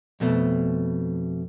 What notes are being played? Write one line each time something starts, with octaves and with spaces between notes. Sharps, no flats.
F2 B2 A3